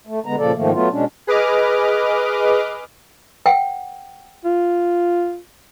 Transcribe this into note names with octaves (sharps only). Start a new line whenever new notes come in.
A3
D3 G#3 B3 A#5
A#2 C#3 F3 A#3 A4 D5
G#2 D#3 F3 A3 A#3
F#3 A3 B3 F4
B2 G#3 C#4 D4
G#4 B4 D#5 D6 F6
F#5 G5
F4